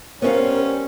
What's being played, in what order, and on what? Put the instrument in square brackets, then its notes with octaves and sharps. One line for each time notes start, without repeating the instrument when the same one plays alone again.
[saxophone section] G3 C#4 [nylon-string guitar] B3 E5 F5 [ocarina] A#4 [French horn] C5